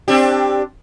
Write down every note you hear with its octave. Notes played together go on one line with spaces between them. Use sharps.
C4 D4 G4